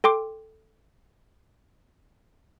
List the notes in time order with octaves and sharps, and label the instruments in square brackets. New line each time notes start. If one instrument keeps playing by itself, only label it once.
[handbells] A4 G5 C6 D6